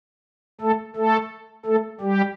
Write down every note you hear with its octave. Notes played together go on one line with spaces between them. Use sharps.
A3 A4
A3 A4
A3 A4
G3 G4